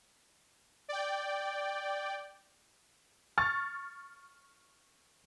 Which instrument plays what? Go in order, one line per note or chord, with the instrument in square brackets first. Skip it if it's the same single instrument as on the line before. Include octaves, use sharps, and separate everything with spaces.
[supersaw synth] D5 G5
[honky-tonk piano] C#6 F6 A6